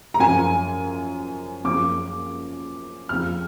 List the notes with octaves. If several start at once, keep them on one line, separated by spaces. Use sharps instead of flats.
A#5
F#2 F3 G#5
F#2 F3 D6
F2 F3 F6